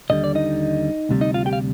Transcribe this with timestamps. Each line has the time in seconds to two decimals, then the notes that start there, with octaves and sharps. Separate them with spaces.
0.10 D#2 D3 G3 D#5
0.24 D5
0.35 D#4 D#5
1.09 D2 C3 G3
1.21 D#4 D#5
1.34 F4 F5
1.46 G4 G5
1.53 F5